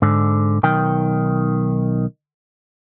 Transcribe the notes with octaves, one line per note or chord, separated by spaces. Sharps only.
G#2 D3
B1 D#3 G5